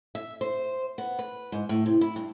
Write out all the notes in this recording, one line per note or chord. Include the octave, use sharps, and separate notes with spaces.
E5
C5
B3
B4
G#2
A2
C3
E4
G2